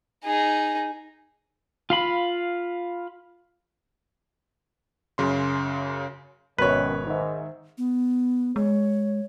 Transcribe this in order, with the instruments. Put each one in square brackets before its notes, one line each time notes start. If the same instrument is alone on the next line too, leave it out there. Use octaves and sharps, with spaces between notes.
[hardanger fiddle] D#4 G#4
[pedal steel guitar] F4 F5 B5
[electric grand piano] F#2 C#3 C6
[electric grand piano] G#1 B2 [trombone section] F#2 D#3 [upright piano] A#4 C#5 [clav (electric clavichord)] B4
[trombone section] G#2 [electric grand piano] D#3 E5
[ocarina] B3
[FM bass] G#3 [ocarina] C#5